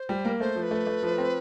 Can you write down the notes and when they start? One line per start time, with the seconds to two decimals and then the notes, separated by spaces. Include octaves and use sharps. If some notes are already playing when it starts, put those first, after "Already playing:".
Already playing: C5
0.09 G3
0.25 A#3
0.40 A3 C5
0.56 F3
0.63 B4
0.71 A3
0.87 A3
1.02 F3
1.18 C4